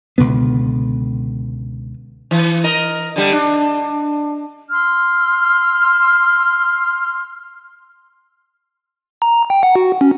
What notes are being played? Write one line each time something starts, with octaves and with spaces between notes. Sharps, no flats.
C#2 B2 D3 B3
E3
A#4 D#5
D3 G3
D4
C6 E6 F6
A#5
G5
F#5
F#4
C#4